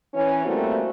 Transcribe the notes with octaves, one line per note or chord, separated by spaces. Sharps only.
E3 C#4
G3 A3 A#3 C4 F#4